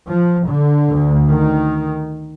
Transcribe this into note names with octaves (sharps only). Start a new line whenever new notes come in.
F3
D3
D2
D#3